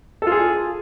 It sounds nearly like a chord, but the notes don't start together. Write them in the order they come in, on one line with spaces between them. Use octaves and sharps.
A4 F4 G#4